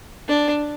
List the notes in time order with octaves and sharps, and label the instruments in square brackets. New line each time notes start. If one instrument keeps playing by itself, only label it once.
[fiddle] D4